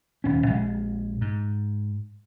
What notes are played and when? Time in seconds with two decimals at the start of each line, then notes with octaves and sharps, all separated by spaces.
0.24 D#1 C#4
0.46 A#1 G#3
1.21 G#2